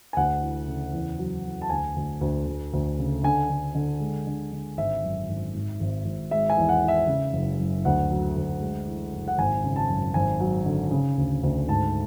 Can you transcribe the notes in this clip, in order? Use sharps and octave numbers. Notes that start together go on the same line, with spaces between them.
G#5
D2 F#5
E3
C#3
E2
F#3
E2
A5
D2 G#5
D2
D2
D2
D2
C#3
D3 G#5
D3
D3
G#3
D3
D3
G#1 E5
F#2
G#1
G#2
G#1
G#1
G#3 E5
G#5
E2
F#5
E3
E5
C#3
F#1
F#2
D2 F#5
F#3
D2
G#3
E3
F#1
F#5
G#1 G#5
C#3
A5
F#2
G#1 G#5
F#3
D3
C#3
D2
D2
G#2 A5